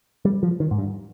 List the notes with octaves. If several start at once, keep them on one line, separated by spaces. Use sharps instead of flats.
G3
F3
D#3
G#2
G2